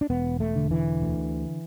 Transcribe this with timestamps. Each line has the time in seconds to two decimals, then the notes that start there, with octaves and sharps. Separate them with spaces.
0.01 D4
0.10 E1 B3
0.40 A3
0.56 D3
0.71 E3
1.02 D2